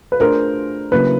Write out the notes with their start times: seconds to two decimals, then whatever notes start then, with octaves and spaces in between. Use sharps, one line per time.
0.12 B4
0.20 A3 D4 F4 G#4 A#4 C5
0.92 C#3 F#3 A#3 C#4 E4 B4